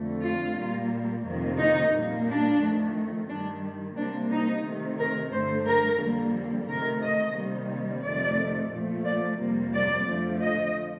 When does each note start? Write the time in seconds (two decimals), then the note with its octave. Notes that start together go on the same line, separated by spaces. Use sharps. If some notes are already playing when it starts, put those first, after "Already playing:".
Already playing: F2 D3 A3
0.23 F4
0.57 A#2 G3 A#3
1.24 F2 C3 D#3 A#3
1.58 D#4
1.93 A#2 G3 A#3
2.27 D4
2.60 F2 D#3 A3
3.29 G2 D#3 G3 D4
3.96 C3 G3 A#3 D4
4.30 D#4
4.64 C3 D#3 A3
4.98 A#4
5.32 G2 D3 A3 C5
5.66 A#4
6.00 F2 D3 G3 A#3
6.67 C3 D#3 A3 A#4
7.02 D#5
7.36 C3 D#3 G3 A#3
8.03 F2 C3 D#3 A3 D5
8.71 A#2 F3 A3
9.06 D5
9.39 F2 C3 G3 A#3
9.73 D5
10.07 F2 D3 F3 A3
10.41 D#5